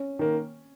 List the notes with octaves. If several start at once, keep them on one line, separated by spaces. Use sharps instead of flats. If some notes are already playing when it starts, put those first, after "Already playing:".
Already playing: C#4
D#3 A#3